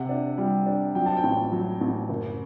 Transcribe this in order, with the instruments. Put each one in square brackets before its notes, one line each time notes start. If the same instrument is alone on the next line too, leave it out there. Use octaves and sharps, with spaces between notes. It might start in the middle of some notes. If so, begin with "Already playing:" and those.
Already playing: [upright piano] C3 F#5
D4
G3
D4
F#3 G5
A5
G5
A1
F#3
A1
F#1